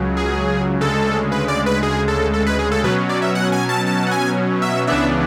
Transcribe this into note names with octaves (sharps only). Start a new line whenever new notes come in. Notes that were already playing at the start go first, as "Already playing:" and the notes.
Already playing: C#2 C#3 F#3
G#4
D2 C#3 G#3 A4
B4
D5
B4
G#4
A4
A4
B4
G#4
A4
B2 F#3 C#4 B4
D5
E5
F#5
G#5
A5
A5
F#5
G#5
E5
C#2 C#3 E3 B3 D4 E5